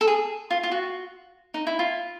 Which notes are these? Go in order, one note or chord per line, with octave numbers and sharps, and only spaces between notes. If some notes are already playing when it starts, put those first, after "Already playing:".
A4
G#4
F4
F4
F#4
D#4
E4
F4